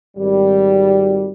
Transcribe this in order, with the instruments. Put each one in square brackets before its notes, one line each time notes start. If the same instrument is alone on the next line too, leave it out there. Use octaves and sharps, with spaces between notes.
[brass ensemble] G#1 G3